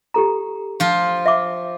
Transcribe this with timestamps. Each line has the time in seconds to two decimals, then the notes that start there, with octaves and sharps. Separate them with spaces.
0.14 G4 A4 A#5
0.80 F3 F4
1.26 E5 F5 D6